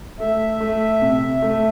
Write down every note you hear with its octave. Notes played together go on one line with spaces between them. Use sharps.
A3 E5
A3
C3
A3